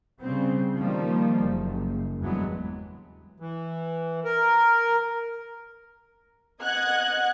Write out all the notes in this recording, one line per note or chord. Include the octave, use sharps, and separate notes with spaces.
C#3 G3 C4
D#3 F3 G3 A#3
F#1
E2 G2 E3 F#3 G#3 B3
E3
A#4
D#5 F#5 F#6 G#6